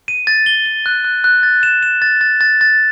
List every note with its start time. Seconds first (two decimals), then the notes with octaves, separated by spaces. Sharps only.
0.08 D#7
0.27 A6
0.46 G7
0.66 G7
0.86 F#6
1.04 F#6
1.24 F#6
1.43 A6
1.63 E7
1.83 E7
2.02 A6
2.21 A6
2.41 A6
2.61 A6